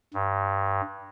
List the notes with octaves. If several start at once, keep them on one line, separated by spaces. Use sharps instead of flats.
G2